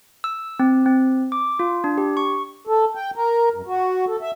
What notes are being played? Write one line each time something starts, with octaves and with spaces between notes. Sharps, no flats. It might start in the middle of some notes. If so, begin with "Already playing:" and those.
E6
C4
C4
D6
F4
D4
G4
C#6
A4
G5
A#4
F#2
F#4
A4
E5